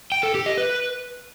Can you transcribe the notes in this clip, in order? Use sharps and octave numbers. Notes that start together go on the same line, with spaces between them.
G5
A4
G4
D#5
B4